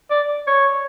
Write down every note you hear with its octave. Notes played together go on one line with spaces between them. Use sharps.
D5
C#5